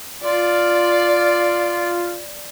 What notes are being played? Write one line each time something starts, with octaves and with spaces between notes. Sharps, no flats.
F4 D5